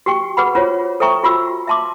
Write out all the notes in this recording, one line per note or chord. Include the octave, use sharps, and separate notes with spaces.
F#4 G4 G5 C#6
F#4 G#4 B4 F#5 B5
C#4 F4 F#4 C5 C#5
A4 C5 E5 G5 A#5 C#6
F4 F#4 B5 E6
E5 F5 A5 C6 D6